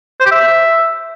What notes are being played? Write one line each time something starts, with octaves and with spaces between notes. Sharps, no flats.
C5
G4
E5